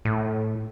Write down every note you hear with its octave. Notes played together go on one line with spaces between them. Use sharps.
A2